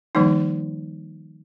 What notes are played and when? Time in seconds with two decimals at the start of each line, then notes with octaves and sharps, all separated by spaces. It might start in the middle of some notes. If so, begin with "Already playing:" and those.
0.15 D#3 F3 G3 A#3 D#4